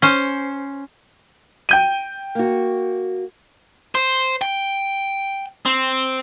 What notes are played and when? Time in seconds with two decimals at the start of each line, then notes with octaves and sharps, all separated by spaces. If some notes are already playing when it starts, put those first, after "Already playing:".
0.02 C#4 C5
1.69 G5 G6 D#7
2.35 A#3 F#4
3.95 C5
4.41 G5
5.66 C4